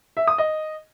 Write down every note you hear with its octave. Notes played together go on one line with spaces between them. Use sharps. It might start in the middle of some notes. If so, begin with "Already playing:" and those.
E5
D#6
D#5